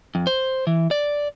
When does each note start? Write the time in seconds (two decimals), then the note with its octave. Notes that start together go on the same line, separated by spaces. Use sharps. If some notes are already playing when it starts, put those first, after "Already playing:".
0.15 F2
0.27 C5
0.67 E3
0.91 D5